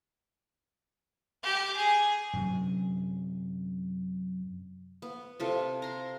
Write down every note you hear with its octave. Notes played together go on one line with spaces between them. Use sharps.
G4
G#4
F#2 C3 F#3
B3
C3 F4 A4
A#5 C6